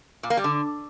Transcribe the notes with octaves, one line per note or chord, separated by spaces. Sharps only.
A#2
A#3
G3
D3